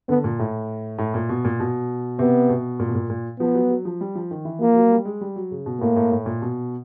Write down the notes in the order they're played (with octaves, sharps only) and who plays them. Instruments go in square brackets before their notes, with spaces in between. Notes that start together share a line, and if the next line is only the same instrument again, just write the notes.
[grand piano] D3 [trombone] B3
[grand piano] A#2
A2
A2
A#2
B2
A#2
B2
[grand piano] C3 [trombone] B3
[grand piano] B2
A#2
B2
A#2
A#2
[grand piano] F3 [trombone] B3
[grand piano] F#3
F#3
F3
G3
F3
D#3
E3
[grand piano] F3 [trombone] A#3
[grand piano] F#3
G3
G#3
G3
F#3
C#3
B2
[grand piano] A2 [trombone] A#3
[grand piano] A2
A2
A#2
B2